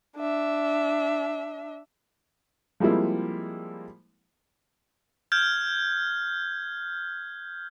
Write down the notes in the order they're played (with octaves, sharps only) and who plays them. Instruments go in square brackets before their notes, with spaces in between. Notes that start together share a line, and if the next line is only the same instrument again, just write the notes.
[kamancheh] D4 E5
[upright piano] F3 G3 G#3 A#3 C4 E4
[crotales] F6 G6 G#6